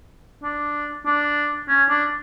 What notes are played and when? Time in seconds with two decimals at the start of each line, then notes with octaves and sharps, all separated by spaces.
0.43 D4
1.06 D4
1.68 C#4
1.89 D4